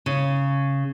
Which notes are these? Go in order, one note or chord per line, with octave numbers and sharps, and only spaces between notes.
C#3